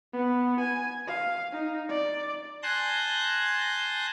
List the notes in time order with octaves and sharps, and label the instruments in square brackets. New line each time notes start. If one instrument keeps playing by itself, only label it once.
[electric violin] B3
G#5
F5
D#4
D5
[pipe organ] G#5 A5 C6 F#6 G6 A#6